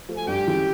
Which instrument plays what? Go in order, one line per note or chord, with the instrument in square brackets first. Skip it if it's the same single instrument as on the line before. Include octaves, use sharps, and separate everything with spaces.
[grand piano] F3 A3
[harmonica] G#5
[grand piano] G2 [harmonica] G4 G5
[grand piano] D#3 G#3 C#4 E4